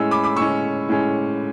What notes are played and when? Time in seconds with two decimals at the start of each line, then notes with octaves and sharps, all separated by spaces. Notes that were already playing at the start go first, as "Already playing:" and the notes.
Already playing: A2 G#3 C#4 E6
0.11 B5 D6
0.23 B5 D6
0.37 A2 G#3 C#4 C#6 E6
0.88 A2 G#3 C#4